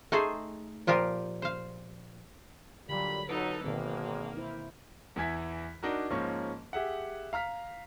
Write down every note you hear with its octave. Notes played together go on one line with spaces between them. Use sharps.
A3 D#4 G#4 A4 C5 G#5
A#2 F3 F4 G4 A#4
C5 F5
A#2 D3 F#3 G3 B5
F2 F#3 D#4 A4 B4
G#1 B2 D#3 A#3 C4
E4 C5 E5
E2 E3 E4 G#5 G#6 B6
D4 D#4 F#4 A#4
G#2 F3 A#3 C#4 C#6
G4 G#4 E5 F#5
F5 A#5 F6 B6